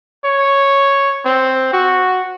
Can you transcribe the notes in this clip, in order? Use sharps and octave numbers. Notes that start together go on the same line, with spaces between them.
C#5
C4
F#4